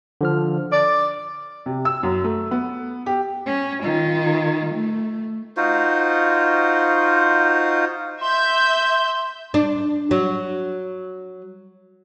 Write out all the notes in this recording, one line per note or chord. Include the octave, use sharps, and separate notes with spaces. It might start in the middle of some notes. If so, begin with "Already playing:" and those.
D3 F3 F6
D5 D6
C3
E6
F#2
A3
B3
G4
C#4
D#3 F4
A3
D#4 F4 F#4 C5
E5 C6 G6
D4
F#3